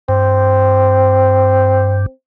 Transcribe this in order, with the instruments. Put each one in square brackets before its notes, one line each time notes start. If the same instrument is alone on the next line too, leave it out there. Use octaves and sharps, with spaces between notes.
[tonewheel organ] G2 [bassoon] C4